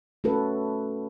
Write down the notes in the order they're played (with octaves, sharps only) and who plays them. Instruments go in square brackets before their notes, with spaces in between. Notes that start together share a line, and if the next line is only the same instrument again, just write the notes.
[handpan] A3 C#4 F#4 A4 B4